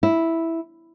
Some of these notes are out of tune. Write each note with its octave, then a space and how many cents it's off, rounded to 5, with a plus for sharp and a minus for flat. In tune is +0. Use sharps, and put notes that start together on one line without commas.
E4 -5